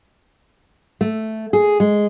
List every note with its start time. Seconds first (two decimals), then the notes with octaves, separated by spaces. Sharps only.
1.01 A3
1.53 G#4
1.80 G#3